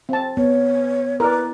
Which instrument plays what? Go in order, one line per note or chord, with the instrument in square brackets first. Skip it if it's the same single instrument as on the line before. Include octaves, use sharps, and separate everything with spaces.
[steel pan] C4 A5
[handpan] B3 [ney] C#5
[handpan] E4 [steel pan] A#4 D5 [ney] B4